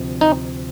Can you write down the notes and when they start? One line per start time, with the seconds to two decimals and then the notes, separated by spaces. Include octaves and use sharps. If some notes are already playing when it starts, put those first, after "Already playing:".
Already playing: D2 C3 F3
0.21 D#4